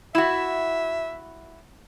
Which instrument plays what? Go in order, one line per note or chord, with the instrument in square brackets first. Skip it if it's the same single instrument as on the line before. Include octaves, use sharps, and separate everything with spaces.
[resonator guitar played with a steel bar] E4 F#4 [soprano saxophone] E5